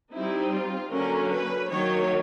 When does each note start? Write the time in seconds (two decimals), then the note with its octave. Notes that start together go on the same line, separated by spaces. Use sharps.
0.13 G3 C4 D#4 E4
0.52 F4
0.91 D3 F#3 A#3 C#4 A#4
1.30 B4
1.69 D#3 F#3 A#3 C#5